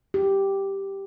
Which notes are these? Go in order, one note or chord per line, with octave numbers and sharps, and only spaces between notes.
G4